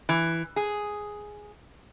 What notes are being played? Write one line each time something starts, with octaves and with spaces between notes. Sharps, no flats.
E3
G#4